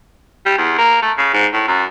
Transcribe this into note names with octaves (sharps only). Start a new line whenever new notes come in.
G3
E2
A#3
A3
C#3
G#2
A2
F#2